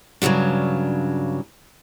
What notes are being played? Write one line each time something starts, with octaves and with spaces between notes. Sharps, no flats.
G2 C#3 F3 F#3 D4